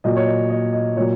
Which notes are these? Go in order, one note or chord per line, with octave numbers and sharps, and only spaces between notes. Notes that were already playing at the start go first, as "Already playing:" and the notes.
A#2 F#3 D#5
C#5
D#5
D#5
D#5
A#2 F#3 C#5